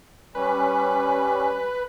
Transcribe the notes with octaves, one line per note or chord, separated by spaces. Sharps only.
G3 C#4 B4